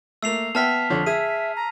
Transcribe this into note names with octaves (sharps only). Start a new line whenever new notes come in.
A3 A#3 E6 C7 F7
B3 E5 G5 A5 F6 B6
F2 D3 C#5
G#4 E5 D#7
A#5